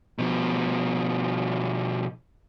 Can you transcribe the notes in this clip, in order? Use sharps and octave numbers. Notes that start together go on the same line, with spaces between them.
B2 F3